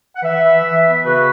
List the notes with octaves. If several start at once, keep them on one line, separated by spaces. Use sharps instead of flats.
F#5
E3 B4 E5
E3
E3
B3
C#3 F#4 B4